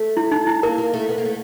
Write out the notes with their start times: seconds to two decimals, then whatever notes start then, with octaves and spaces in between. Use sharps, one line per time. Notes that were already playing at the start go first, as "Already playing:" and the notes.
Already playing: A3
0.17 E4
0.31 D#4
0.47 E4
0.63 A#3 A#4
0.78 A#3
0.94 A3
1.09 B3
1.18 A#3
1.25 A3